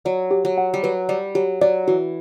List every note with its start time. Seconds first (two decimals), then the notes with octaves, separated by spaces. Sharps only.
0.05 F#3 D5
0.31 G4
0.45 F#3
0.58 F#5
0.74 G3
0.83 F#3 B4
1.09 G3 D5
1.35 F#3 G4
1.61 F#3 D5
1.88 E3 F#4